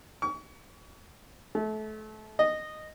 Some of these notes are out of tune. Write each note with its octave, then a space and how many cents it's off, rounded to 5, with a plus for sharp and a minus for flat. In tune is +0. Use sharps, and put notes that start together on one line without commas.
C#6 +35
A3 -30
D#5 -10